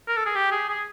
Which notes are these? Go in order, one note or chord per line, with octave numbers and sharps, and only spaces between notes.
A#4
A4
G#4
G4
G#4
G#4